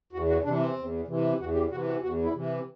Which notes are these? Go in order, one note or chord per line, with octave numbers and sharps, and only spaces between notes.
E2 F#4
F#4
C3 E3 D4
C4
E2
C3 E3
E2 F#4
G4
C3 E3 F#4
F#4
E2 F#4
E4
C3 E3